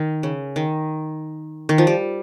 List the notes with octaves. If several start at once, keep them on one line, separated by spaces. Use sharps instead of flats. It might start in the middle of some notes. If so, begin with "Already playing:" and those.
Already playing: D#3
C#3
D#3
D#3
F3
G3